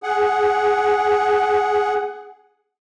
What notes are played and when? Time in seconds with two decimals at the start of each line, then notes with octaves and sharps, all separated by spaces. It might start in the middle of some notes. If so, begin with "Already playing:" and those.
0.03 G#4 F#5